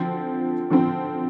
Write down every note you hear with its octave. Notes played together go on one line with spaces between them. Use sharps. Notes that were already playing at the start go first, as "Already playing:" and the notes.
Already playing: D3 F3 C4
D3 F3 C4